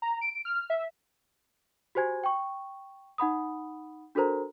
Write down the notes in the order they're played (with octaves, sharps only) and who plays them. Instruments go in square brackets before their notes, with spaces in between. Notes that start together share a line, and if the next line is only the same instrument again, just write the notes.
[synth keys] A#5
D7
F6
E5
[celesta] F#4 G4 C5 G#5 G#6
G5 C#6
D#4 F#5 B5 D#6
D4 F#4 A4 A#4 C5 A#5